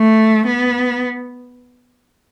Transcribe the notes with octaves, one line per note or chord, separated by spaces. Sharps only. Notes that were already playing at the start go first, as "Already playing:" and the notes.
Already playing: A3
B3